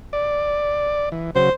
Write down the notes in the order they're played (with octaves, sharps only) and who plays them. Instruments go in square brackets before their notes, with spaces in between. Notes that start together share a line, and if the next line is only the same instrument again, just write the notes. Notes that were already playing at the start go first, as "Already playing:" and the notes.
[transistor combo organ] D5
E3
[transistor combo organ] C#3 F#3 [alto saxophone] C5